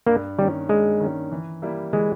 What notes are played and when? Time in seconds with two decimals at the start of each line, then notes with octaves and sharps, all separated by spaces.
0.07 G2 A#3
0.38 D#3 G3 A#3 C#4
0.69 G2 G#3
1.00 D#3 A#3 C#4
1.32 E3
1.62 G3 A#3 E4
1.93 E3 G#3